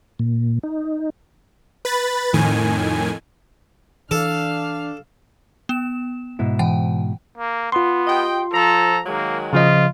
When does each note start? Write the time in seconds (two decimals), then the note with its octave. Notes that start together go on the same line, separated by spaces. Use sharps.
0.19 A#2
0.63 D#4
1.85 B4 B5 A6
2.33 F2 A2 D#3 G#5
4.11 E3 D4 A4 F5 F6
5.69 B3 E7
6.39 G#2 B2 E4
6.59 E3 F#5 G5
7.38 A#3
7.72 B3 F4 C6
8.07 G4 D#5 G5
8.53 F3 A4 A#5
9.06 D#3 F#3 G#3 A#3
9.53 C#3 F3 F4 D#5